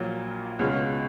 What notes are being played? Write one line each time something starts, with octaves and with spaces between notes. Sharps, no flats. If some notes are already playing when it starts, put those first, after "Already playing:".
Already playing: A#1 A#2 F#3 A#3
C#2 B2 G#3 C#4 F4